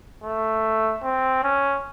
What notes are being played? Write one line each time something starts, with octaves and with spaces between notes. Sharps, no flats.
A3
C4
C#4